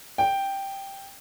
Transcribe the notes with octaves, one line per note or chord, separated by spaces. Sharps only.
G5